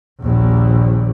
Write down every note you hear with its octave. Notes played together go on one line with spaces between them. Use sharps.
A#1 D#2